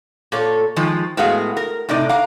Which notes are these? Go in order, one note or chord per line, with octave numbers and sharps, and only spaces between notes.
A#2 A4 C#5
D#3 F3 G#3
A2 G#3 B3 F#4 G#4 F5
A#4
A2 C3 D#4 D5
F5 A#5